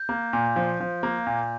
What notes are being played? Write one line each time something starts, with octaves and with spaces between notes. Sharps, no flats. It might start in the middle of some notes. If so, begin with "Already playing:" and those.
Already playing: G6
A#3
A#2
F3
F3
A#3
A#2